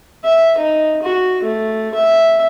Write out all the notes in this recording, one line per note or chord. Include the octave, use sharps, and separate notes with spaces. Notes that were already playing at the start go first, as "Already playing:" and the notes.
E5
D#4
F#4
A3
E5